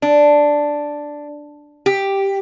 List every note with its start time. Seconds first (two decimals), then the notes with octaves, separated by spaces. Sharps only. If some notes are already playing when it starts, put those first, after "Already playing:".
0.02 D4
1.86 G4